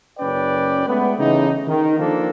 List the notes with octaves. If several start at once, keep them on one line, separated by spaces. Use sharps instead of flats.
F#1 C#4 B4 D5 G5
G#3 A3 B3
C#3 E3 A3 D#4
D#3
D#3 F3 A#3 D4 A4